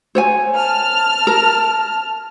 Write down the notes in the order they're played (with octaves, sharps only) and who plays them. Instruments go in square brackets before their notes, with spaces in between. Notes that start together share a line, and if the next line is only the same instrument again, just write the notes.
[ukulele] C5 C#5 G#5
[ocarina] A5 [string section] F6
[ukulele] A#4